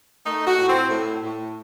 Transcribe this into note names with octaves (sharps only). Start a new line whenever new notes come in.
A3 D#4
F#4
A2
C4
A2
A2